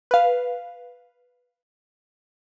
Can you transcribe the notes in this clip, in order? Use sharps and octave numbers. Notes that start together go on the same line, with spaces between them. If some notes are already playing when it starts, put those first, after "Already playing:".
B4 F5